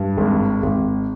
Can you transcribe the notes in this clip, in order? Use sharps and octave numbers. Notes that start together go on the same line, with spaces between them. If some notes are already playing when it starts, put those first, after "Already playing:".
Already playing: G2
G#1
G#1